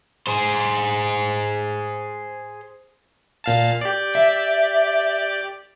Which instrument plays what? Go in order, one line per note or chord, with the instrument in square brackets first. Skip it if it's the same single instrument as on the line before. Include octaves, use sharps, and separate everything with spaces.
[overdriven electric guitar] G#4 C5
[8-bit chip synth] A#2 F5 A5
G4 D5
[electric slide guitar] E5